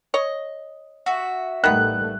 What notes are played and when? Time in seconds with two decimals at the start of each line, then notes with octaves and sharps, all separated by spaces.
0.14 C#5 D#5
1.06 F#4 E5
1.64 A1 D#3 G3 A3 B3 F#6